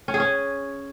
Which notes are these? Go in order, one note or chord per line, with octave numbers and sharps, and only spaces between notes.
C#4
G#4
C#4